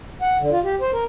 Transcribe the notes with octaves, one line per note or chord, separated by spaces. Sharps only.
F#5
D3
F4
G4
C5
A#4